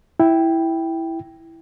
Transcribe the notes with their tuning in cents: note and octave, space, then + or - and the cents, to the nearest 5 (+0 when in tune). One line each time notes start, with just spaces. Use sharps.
E4 +0 G5 +0